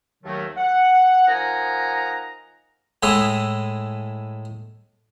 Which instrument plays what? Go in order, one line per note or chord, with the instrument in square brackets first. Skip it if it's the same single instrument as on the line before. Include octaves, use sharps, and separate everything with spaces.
[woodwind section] D#2 D#3 F#3 A3
F#5
F3 D#4 A#4 F#5 G#5 A#5
[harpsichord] A2 G#3 A3 E4 D#5